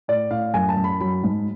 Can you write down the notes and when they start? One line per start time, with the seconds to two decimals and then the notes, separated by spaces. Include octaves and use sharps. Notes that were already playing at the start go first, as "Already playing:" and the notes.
0.08 A2 D5
0.31 A2 F5
0.54 F#2 G#5
0.69 A5
0.77 F#2
0.84 B5
1.00 F#3 B5
1.23 G#2